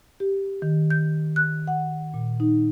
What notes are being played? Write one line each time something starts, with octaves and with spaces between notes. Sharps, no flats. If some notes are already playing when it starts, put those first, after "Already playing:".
G4
D#3
G6
F#6
F#5
A#2
D#4